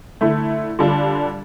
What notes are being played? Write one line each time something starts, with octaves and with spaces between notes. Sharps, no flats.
D3 A3 E4
D3 G3 D4 F4